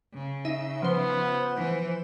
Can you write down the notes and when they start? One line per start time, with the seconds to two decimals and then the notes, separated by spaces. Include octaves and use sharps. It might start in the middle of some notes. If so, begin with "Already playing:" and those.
0.14 C#3
0.45 D#4 E5
0.82 F3 B3 C5
1.56 E3